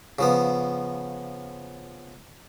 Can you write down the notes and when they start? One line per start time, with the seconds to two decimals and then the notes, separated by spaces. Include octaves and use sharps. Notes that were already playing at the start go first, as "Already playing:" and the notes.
0.19 C#3 F3 B3